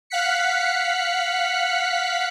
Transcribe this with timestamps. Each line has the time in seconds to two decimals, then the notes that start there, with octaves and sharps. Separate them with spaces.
0.10 F5 F#5 F#6 B6 C#7